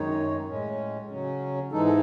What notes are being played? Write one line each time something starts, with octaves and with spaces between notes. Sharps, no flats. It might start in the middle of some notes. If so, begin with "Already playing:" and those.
Already playing: F#2 D#3 G#3 D#4 C#5
A2 G#3 C#4
C#3 F#3 C#4
G#2 E3 G#3 D#4 A4
A4